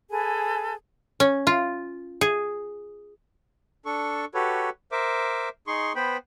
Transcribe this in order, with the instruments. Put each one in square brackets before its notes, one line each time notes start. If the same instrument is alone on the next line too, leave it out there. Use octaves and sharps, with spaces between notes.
[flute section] G#4 A4 B4 G#5
[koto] C#4
F4
G#4
[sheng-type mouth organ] D4 A4 C#6
F#4 G4 A4 B4 C#5
A#4 C5 E5 D6
D#4 G#4 C6 C#6
B3 B4 C5 G5 B5